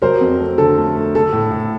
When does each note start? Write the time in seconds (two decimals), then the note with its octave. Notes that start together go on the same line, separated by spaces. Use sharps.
0.02 F#3 A#4 C5
0.21 F2
0.39 A3
0.58 D3 A4
0.78 A3
0.96 A3
1.15 A3 A4
1.33 A2
1.51 A2